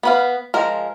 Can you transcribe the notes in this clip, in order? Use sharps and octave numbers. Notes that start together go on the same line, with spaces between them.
B3 B4 F5
F3 G#3 A#4